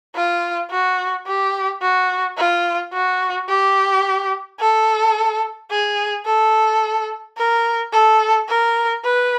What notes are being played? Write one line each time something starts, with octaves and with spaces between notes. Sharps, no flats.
F4
F#4
G4
F#4
F4
F#4
G4
A4
G#4
A4
A#4
A4
A#4
B4